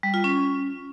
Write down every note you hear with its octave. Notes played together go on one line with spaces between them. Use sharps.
G3
F4
C#4